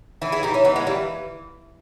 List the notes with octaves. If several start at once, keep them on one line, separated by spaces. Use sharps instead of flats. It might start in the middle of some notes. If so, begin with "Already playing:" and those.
E3 E4 G#4
E4 G#4
E3 D#4 G4
C#4 E4
E3 B3 D#4
G#3 B3
E3 G3 A#3